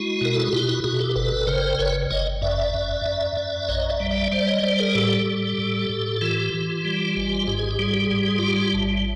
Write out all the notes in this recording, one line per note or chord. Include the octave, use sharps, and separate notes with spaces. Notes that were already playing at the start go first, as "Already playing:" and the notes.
Already playing: G#3 E4 F#4
B2 A#4
A4
G#4
B2 F4 G4
E4 F#4
B2 F#4 G#4
G4 A4
G1 A4 B4
C#3 A#4 C5
G1 B4 C#5
G1 C#5 D#5
F#2 D5 E5
F#2
F#2
F#2
A#1 C#5 D#5
D5 E5
G3
D5 E5
G3 C5 D5
C#5 D#5
G3 C5 D5
G#4 A#4
A2 G4 A4
G3
A2
A2
E3 F4 G4
E3
G3
G#1
G#2 G4
G#4
G4
G3 G#4
G4
G#4
G#2 G4
G#4
G3 F4 G4
A1